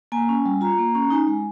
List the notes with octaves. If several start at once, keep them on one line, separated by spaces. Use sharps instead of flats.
A#3 G#5
C#4
G3
F4 A#5
A#3
C#4
D#4 G#5
G#3